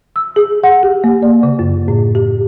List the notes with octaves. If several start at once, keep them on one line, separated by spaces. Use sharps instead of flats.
E6
G#4
F#5
G4
A#3
D5
C#3
F#2
A2
G4